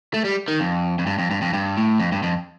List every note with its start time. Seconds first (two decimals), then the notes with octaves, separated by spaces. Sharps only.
0.14 A3
0.24 G3
0.48 D#3
0.60 F2
0.99 F2
1.07 G2
1.19 F2
1.31 G2
1.42 F2
1.53 G2
1.77 A2
2.00 F2
2.12 G2
2.23 F2